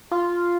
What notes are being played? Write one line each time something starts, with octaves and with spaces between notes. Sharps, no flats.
F4